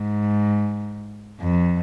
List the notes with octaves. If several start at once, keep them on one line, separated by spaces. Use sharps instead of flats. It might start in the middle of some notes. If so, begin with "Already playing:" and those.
Already playing: G#2
F2